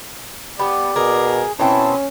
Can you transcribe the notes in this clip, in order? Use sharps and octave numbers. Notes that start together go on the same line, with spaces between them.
B3 G4 D5
B2 G#4 A#4
B2 C4 C#4 E4 A5